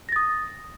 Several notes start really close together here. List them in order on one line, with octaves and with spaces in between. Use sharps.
A#6 A6 D#6